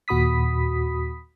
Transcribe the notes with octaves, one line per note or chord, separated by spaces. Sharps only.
D#2 A#2 F#4 B5 D#6 B6